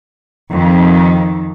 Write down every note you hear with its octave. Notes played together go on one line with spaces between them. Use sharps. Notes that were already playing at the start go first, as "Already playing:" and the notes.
F2 D#3